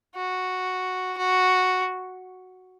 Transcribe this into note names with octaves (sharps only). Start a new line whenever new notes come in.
F#4
F#4